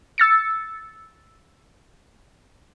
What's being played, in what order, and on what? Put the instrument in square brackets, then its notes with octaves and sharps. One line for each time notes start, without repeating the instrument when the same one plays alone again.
[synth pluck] E6 A6 C#7